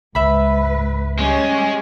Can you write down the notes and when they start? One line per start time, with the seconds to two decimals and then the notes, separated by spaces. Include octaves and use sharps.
0.15 C#2 G#2 B4 E5 B5
1.19 G3 G#3 C#4 G4